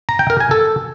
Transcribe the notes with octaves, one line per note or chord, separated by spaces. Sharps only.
A#5
G5
A#4
G#5
A4